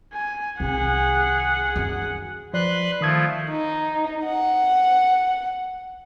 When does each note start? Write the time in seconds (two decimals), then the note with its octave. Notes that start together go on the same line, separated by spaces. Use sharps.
0.14 G#5
0.60 C2 D#3 G#4 F#5
1.76 F#2 D#3
2.54 F3 B4 D5 C6 F#6
3.01 D#3 F3 A3 D#6 G#6
3.50 D#4
4.26 F#5